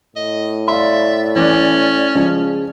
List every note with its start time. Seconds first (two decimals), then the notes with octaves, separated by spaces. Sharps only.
0.16 A2 D#5
0.68 D5 E5 F5 C6
1.36 E3 C#4 D6 F#6
2.15 C#3 F3 G#3